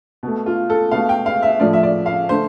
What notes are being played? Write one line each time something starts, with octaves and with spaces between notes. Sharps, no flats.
B2 A3
F4
A4
B2 A3 F5
G5
F5
E5
A2 F3 A3 D5
E5
D5
F5
D3 A3 C5